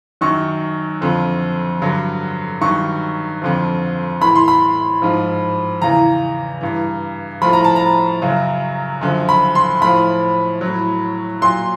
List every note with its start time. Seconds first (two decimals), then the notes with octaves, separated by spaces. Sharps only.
0.21 F#2 D#3 F#3 C#6
1.01 F2 D3 F3
1.82 G2 D3 F#3
2.61 G2 D#3 F#3 C#6
3.42 F2 D3 F3
4.21 A2 E3 B5
4.36 C6
4.48 B5
5.02 G#2 F3
5.82 E2 C#3 E3 A#5
6.61 G2 E3
7.42 A2 F3 B5
7.53 A#5
7.64 A5
7.76 A#5
8.22 F#2 C#3 F#3
9.01 F#2 D3 F3
9.29 B5
9.55 C6
9.82 A2 F3 B5
10.61 F#3
10.67 A2
11.42 A#2 F#3 C6